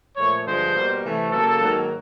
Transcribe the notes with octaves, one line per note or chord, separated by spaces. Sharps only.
A#2 F3 A3 C#5
G2 D3 F3 G#3 C5
B2 G3 A#3
C3 E3 A3
C#3 F#3 A#3 A4
G#2 D#3 F#3 A#3